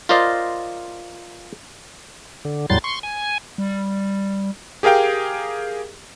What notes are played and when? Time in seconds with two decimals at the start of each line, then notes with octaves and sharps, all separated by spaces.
0.09 F4 A#4 C5 D5 D#5 F5
2.45 D3
2.70 E2 A2 F#3 G3 C6 A6
2.84 C6 C#6
3.03 G#5
3.58 G3
4.83 G4 G#4 A#4 F5 G5